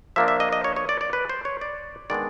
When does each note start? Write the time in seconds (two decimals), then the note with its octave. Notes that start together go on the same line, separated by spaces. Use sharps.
0.16 F3 A#3 D4 E5
0.28 E5
0.40 D#5
0.52 D#5
0.64 C#5
0.76 C#5
0.89 D5
1.01 D5
1.13 B4
1.29 C5
1.45 C#5
1.61 D5
2.10 D#3 G#3 B3 D4 D5